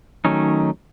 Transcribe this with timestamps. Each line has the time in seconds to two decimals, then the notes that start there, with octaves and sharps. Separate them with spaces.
0.25 D#3 F#3 A3 C#4 D#4